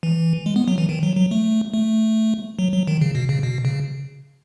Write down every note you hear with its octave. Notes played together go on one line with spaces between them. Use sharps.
E3
G#3
B3
F#3
E3
D#3
F#3
F#3
A3
A3
F#3
F#3
D#3
C#3
B2
C#3
B2
C#3